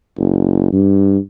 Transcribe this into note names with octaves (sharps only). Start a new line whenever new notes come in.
F#1
G2